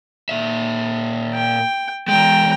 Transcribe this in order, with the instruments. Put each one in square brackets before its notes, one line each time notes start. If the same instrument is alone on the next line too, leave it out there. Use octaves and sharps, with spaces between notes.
[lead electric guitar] A#2 E5
[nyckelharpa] G5
[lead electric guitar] E2 G#3 [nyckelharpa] G5 A#5